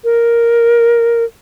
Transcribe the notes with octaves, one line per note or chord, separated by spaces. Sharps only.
A#4